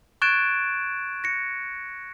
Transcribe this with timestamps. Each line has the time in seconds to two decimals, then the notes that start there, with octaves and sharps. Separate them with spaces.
0.22 C#6 F#6 G#6 A6 D7 E7
1.24 A#6 C#7